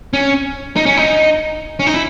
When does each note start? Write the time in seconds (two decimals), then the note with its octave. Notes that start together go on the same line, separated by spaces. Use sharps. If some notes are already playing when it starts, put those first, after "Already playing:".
0.13 C#4
0.76 D#4
0.86 C#4
0.97 D#4
1.80 C#4
1.87 D#4
1.94 E4